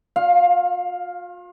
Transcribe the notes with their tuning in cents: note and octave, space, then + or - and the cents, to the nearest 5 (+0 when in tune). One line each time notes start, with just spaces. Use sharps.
F4 +40 F5 +5